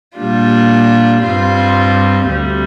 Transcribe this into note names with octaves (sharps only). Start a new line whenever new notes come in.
A#2 G3 D4 F4
G2 G3 C4 F4
D2 C3 G3